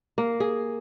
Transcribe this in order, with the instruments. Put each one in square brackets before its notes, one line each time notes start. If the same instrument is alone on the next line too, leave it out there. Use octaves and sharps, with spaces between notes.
[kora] A#3
G#4